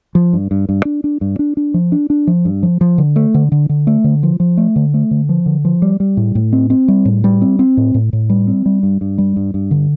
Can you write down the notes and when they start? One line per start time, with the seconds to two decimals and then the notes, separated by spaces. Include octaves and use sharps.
0.15 F3
0.33 G2
0.51 G2
0.69 G2
0.85 D4
1.04 D4
1.21 G2
1.39 D4
1.57 D4
1.74 F3
1.92 D4
2.10 D4
2.27 F3
2.45 G2
2.63 F3
2.81 F3
2.98 D3
3.16 A3
3.34 D3
3.52 D3
3.69 D3
3.87 A3
4.04 D3
4.23 F3
4.40 F3
4.57 A3
4.76 D3
4.94 A3
5.11 D3
5.29 F3
5.46 D3
5.65 F3
5.82 G3
6.00 G3
6.17 A2
6.35 A2
6.53 C4
6.70 C4
6.88 G3
7.05 A2
7.24 G3
7.42 C4
7.59 C4
7.77 A2
7.94 A2
8.13 A2
8.30 G3
8.47 C4
8.66 G3
8.83 G2
9.01 G2
9.18 G3
9.36 G2
9.54 G2
9.71 D3